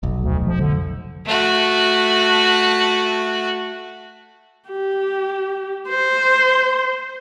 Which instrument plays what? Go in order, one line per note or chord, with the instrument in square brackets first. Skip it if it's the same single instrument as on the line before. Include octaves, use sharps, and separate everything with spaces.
[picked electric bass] F1 B1
[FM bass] D2
F3
D3
[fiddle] A3 F#4
[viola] G4
C5